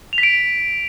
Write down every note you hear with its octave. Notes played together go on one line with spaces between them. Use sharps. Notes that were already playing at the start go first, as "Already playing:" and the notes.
F7
B6
D7